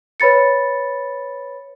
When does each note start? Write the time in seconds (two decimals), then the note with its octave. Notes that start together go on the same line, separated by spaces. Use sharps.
0.20 B4 C#5 B5 A6 C#7